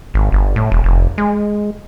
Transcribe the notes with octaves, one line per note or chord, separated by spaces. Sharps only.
G#1
G1
A2
E1
F1
G#3